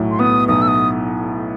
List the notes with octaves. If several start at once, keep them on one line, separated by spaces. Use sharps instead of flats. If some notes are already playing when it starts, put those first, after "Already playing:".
Already playing: B1 A2 F#3
C6
B3 D#6
B1 D#6
E6
D#6